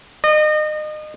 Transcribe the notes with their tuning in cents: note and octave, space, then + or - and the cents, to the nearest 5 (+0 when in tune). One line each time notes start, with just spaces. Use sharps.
D#5 -30